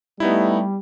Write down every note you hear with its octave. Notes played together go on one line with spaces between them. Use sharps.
G3 A3 B3 D#4 E4